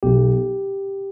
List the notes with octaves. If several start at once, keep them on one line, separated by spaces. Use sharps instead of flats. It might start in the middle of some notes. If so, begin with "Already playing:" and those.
B1 G4